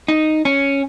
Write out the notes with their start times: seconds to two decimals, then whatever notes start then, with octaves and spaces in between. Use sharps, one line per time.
0.08 D#4
0.45 C#4